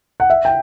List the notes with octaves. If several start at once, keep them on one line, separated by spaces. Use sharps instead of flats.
F#5
E5
G5